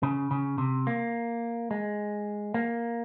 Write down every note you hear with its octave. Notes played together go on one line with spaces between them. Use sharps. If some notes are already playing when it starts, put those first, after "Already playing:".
C#3
C#3
C3
A#3
G#3
A#3